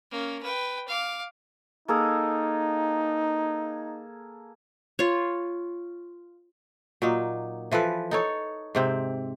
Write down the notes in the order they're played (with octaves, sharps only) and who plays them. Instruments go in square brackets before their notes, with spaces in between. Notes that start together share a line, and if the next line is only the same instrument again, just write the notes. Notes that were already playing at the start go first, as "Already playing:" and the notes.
[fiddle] A#3 C#4
B4 G5
F5 D6
[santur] A#3 G#4 A4 [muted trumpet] D#4
[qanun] F4 C#5
[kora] A#2 F#3 D#4
E3 F3 A4 B4
D#4 A4 C#5
G#2 C3 C4